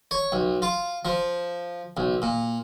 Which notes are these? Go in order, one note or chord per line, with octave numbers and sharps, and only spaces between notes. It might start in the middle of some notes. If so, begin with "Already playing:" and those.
C#5
B1
F4
F3
B1
A#2